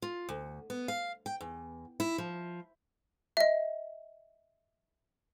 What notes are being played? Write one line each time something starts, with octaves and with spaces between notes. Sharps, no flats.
F4
D2
B3
F5
G5
E2
E4
F3
D#5 E5